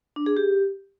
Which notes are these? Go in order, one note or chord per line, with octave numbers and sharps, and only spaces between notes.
D4
G#4
G4